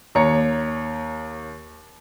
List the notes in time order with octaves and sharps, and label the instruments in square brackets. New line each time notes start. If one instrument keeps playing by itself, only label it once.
[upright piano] D#2 C#5 A#5 C#7